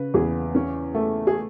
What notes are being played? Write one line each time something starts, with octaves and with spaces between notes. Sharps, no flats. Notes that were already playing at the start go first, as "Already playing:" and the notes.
Already playing: C#3 B4
E2 G#4
C#4
A3
G#4